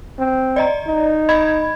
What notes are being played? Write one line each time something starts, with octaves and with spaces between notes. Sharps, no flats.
C4
D5 D#5 A#5
D#4
D#5 B5 G#6